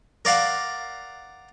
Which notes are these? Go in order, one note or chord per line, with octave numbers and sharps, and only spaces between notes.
A#4 D5 F5 F#5